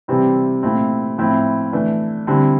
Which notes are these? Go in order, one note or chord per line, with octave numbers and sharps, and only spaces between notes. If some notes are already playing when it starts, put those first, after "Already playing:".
C3 E3 G3 C4 E4
A#2 A3 C4 E4
A2 F3 C4 E4
E3 A3 D4
D3 G3 C4 E4